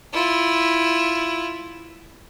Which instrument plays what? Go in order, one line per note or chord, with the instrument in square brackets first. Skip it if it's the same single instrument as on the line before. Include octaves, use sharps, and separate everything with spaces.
[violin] E4 F4